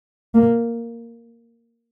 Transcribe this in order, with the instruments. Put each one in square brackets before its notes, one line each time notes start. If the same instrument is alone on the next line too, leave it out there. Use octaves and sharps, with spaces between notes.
[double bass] A#3